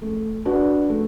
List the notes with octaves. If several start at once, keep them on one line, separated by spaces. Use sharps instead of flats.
A3
D4 F#4 B4
A3